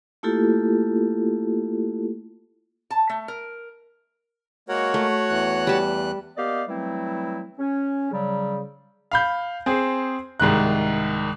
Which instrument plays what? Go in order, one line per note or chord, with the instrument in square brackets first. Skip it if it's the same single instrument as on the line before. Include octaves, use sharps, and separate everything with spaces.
[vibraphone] A3 A#3 E4 F4 G4 A4
[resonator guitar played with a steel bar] A5
A3
A#4
[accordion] G#3 A#3 A#4 [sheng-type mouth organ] F#4 C#5 F#5
[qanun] A3
[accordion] E2 E3 F#6
[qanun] G3 A5
[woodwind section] A#3 B3 G4 D5 D#5 F5
E3 F#3 G3 A3 C4 E4
C#4
C#3 F#3 G3
[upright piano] F5 B5 G6
C4 G#4 C5
C2 G#2 D#3 F#6